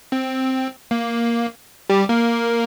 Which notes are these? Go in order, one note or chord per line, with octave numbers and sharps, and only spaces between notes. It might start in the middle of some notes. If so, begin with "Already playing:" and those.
C4
A#3
G3 G4
A#3 A#4